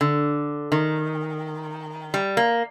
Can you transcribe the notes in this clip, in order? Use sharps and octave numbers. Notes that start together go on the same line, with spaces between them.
D3
D#3
G3
A#3